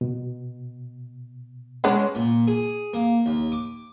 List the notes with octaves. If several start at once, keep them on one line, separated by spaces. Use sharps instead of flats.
B2
G#3 B3 C#4 D4
A#2
G#4
A#3
D#2
D6